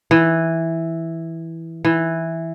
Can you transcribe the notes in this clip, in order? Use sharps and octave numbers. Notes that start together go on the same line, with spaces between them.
E3
E3